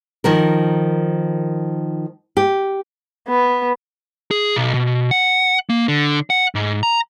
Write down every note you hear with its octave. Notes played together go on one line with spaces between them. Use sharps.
D#3 F3 A#4
G4
B3
G#4
B1
B2
F#5
A#3
D3
F#5
G#2
A#5